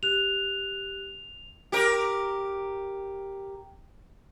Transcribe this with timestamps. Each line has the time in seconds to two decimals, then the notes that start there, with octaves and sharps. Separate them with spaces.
0.03 G4 F#6 F7
1.72 G4 A#4